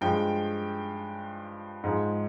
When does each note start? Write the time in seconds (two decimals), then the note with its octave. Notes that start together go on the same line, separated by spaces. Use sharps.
0.01 G2 F3 G#3 G5
1.84 G#2 F3 G#3